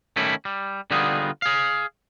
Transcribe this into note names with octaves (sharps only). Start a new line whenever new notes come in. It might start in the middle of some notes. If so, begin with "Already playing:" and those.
D#3 G3 A3 C#4 E4
G3
D3 G3 B3 D#4 F4 G#4
G#4 F5